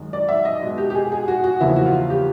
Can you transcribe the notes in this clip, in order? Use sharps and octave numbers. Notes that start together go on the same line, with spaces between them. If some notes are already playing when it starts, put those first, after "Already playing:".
Already playing: F#2 D#3 G#3
D5
E5
D#5
B2 G#3
G4
G4
G#4
G#4
F#4
F#4
E2 C#3 F3 A#3 E4
F#4
F4
G4